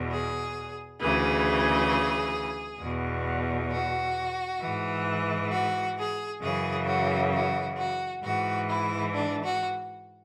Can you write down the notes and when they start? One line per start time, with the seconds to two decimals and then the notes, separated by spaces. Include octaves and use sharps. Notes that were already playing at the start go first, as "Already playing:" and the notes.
Already playing: E2 B2
0.10 G#4
0.99 D2 C#3 E3 G#4
2.81 E2 B2
3.71 F#4
4.61 G#2 E3
5.52 F#4
5.97 G#4
6.42 F#2 C#3 E3 G#4
6.87 F#4
7.33 F#4
7.77 F#4
8.23 G#2 E3 F#4
8.68 E4
9.14 D4
9.43 F#4